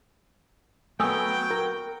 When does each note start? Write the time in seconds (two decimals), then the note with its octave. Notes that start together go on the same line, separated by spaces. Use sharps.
1.00 F#3 A3 B3 G5 G#5 D#6 E6
1.51 A#4